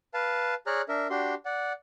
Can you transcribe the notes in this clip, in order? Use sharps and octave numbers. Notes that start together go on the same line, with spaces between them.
B4 F5 A5
G#4 C#5 D5 A#5 F6 F#6
D4 A#4 E5
D4 F#4 G4 C6
D5 F#5